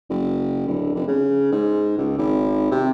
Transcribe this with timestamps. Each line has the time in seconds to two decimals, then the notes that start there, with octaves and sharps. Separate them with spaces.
0.10 F#1
0.68 D1
0.95 F1
1.08 C#3
1.52 G#2
1.98 C#2
2.17 G#1
2.71 C3